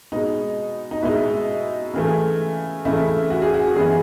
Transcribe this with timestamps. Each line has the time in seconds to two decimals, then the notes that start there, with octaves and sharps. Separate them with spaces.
0.12 B2 G#3 D#4
0.91 D#4
1.02 B2 G#3 D#4 E4
1.93 C#3 E3 A3
2.85 C#3 E3 A3 E4
3.30 F#4
3.42 G#4
3.54 F#4
3.76 F#2 E3 B3 D#4 G#4